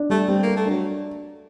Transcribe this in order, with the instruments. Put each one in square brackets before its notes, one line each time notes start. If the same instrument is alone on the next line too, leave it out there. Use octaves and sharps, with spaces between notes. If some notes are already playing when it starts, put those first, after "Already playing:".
Already playing: [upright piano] D4
[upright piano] G3 [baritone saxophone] A3
[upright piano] G3 [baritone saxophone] C4
[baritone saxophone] A#3 [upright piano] A4
[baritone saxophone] A3
[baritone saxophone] F#3 [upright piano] D4